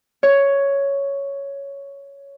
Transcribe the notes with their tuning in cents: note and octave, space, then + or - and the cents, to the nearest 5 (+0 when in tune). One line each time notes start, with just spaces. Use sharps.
C#5 +5